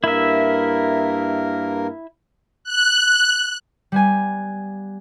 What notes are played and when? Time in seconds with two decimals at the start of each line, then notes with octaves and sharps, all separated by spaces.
0.04 G2 A#3 E4 A#4 E5
2.64 F#6
3.92 G3 B3 G#5